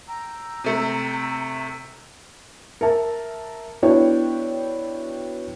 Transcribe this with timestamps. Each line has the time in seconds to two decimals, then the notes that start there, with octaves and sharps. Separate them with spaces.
0.08 G5 A#5 E6
0.64 C3 A3
2.81 A#4 E5 A5
3.82 B3 D4 E4 F#4 C#5 G5